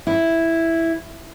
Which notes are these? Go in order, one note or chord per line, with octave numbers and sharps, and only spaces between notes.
E4